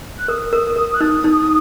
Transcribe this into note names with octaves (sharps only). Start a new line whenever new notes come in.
F#6
A#4 D#6
A#4
A#4
F#6
D#4 D#6
D#4